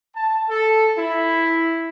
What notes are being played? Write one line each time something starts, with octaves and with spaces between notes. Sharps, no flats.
A5
A4
E4